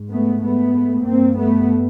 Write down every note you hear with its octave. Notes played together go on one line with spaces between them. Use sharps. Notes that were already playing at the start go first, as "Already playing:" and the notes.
Already playing: G#2
A3 B3
A3 B3
G2 A#3 C4
A3 B3